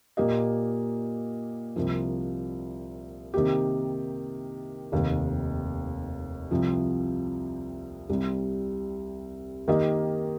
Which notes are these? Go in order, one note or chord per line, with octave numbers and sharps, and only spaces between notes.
A#2 A#3 G4 D#5
C2 C3 F3 A#3
C3 D#3 A#3 G4
F1 D#2 D#3
C2 C3 F3
C2 C3 G3
D#3 A#3 G4 D#5